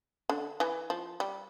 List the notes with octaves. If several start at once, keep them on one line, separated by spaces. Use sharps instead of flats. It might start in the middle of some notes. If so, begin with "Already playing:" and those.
D3
E3
F3
G3